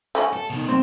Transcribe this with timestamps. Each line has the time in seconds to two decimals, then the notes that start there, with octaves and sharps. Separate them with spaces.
0.15 A3 C#4 F#4
0.33 A4
0.50 B2 D#3
0.68 C4